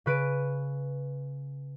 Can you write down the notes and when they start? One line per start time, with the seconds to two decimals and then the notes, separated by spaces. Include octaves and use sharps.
0.06 C#3 B4 D7 D#7